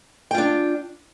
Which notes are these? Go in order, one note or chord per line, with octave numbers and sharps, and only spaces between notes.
D4 F4 G5